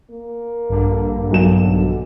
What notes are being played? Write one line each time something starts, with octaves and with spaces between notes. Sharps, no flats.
A#3
A#1 G2 D3
B1 F#3 E7